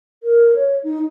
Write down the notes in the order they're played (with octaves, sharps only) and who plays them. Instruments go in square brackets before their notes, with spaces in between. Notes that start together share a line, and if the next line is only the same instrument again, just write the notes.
[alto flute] A#4
C#5
D#4